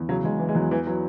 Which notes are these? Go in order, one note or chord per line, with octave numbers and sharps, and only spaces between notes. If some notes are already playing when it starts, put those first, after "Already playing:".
Already playing: E2
C#3 F#3
E2 G#3
E3
G#3
E2 F#3
E3
E3 F#3